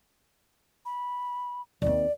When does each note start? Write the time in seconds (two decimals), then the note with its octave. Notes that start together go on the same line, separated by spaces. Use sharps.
0.85 B5
1.82 D#2 C4 D5